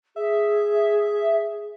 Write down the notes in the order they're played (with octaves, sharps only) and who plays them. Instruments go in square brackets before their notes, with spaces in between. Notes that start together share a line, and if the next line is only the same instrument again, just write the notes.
[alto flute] G#4 [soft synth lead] E5